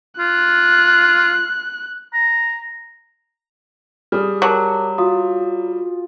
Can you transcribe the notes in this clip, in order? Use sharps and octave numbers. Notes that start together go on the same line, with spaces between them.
F4 F#6
A#5
G3 G#4 D#6 F6
F#3 A#4 A5 D6
F4 F#4 D#6